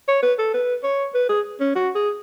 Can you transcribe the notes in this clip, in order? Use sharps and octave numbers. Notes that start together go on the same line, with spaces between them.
C#5
B4
A4
B4
C#5
B4
G#4
C#4
F#4
G#4